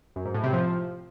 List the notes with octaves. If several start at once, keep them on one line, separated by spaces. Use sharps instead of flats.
F#2
G#2
A2
C3
F3